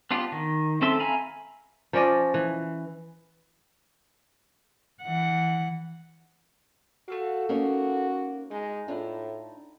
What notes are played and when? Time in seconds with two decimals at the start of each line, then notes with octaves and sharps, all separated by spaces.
0.11 B3 D4 F4 G4
0.32 D#3
0.82 C4 C#4 A4 E5 C6
1.00 E5 F5 G#5 A#5 B5
1.93 F3 C#4 D5 D#5
2.34 E3
5.03 E3 F#5
7.08 A3 F#4 A4 F5
7.49 A#3 C#4 D#4 F#4
8.51 G#3 D#4
8.88 A2 D4 E4 F4